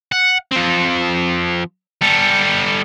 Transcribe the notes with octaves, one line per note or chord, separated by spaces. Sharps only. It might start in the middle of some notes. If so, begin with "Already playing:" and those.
F#5
F3 C4
G3 A4